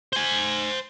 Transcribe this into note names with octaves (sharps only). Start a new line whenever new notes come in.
C5 G#5